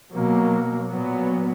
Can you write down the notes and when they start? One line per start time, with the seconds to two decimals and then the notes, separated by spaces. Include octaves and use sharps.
0.14 B2 F#3 A#3
0.89 A#2 F#3 B3